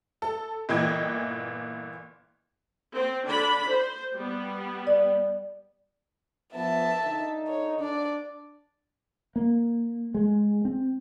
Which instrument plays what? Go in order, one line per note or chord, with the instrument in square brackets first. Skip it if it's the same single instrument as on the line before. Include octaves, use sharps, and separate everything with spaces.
[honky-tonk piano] A4
G1 A#2 E3 D#5 G5 G#6
[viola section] C4
D3 D4 B5
C5
G3 B3
[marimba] D5
[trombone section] F3 B3 [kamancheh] E5 A5
[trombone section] D3 D#4
[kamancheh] C#5
[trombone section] D4 [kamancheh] D5
[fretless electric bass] A#3
G#3
C4